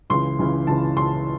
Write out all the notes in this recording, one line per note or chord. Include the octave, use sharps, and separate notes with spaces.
C#2 C#3 E3 C6
C#2 C#3 E3
C#2 C#3 E3 A5
C#2 C#3 E3 C6